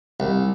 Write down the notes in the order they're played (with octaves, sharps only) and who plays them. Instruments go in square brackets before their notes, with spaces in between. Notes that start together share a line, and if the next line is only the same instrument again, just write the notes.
[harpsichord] C2